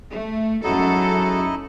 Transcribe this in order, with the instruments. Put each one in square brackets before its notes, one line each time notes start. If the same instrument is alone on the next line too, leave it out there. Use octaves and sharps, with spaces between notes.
[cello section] A3
[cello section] F#2 A4 [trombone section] F#3 G#3 F#4 [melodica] D#4 E4 D#5